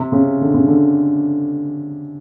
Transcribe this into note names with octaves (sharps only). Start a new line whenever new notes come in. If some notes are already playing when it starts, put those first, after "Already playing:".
Already playing: C3
C#3
D3
C#3
D3